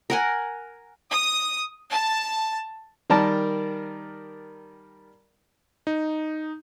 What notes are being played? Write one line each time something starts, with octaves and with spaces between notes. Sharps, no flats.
A#4 F#5 G#5
D#6
A5
D#3 G3 A#4 D5 A5
D#4